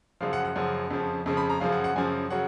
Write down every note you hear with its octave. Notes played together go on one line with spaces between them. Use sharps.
F#2 C#3 F3 F5
F#5
F#5
F#2 C#3 F3
F2 C#3 F3
F2 C#3 F3
B5
A#5
F#2 C#3 F3 F5
F#5
F#5
F#2 C#3 F3 G#5
C#3 F#3 F#5